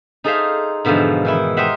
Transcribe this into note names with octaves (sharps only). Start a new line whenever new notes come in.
D#4 G#4 A4 C5 E5 F5
G#2 B2 D3 E3 F3
D#3 E3 E4
G4 A#4 C5 D#5 E5 F#5